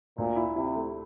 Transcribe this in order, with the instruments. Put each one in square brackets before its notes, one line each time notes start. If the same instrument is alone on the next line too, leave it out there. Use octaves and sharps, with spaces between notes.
[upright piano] D2 [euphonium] A#2
[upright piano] E4
[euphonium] C3 [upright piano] E4
[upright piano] A3